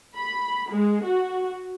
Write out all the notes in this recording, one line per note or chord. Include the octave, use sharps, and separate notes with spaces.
B5
G#3
F#4